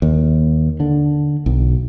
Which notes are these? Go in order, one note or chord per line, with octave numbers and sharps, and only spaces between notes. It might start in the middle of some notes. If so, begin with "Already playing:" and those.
D#2
D3
B1